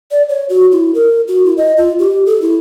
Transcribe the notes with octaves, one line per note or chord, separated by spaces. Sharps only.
D5
C#5
F#4
E4
A#4
F#4
E4
D#5
F4
G4
A4
E4